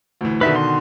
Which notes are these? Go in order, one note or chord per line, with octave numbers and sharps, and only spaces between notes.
D2 A2 E3
B2 D3 D#3 B4 E5
C6